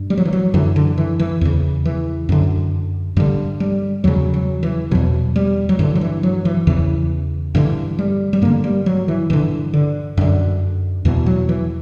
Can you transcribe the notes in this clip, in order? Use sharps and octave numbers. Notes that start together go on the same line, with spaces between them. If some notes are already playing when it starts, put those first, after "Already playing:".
Already playing: G2
G3
F#3
E3
F#3
F#2 D3 E3
D3
E3
E3
E2 C#3
E3
F#2 D3
G2 D3 G3
G3
E2 C#3 F#3
F#3
E3
E2 B2 F#3
G3
F#3
G2 D3 E3
F#3
E3
F#3
E3
E2 C#3 E3
G2 D3 E3
G3
G3
G2 D3 A#3
G3
F#3
E3
G2 D3 E3
D3
F#2 D3
E2 B2 E3
F#3
E3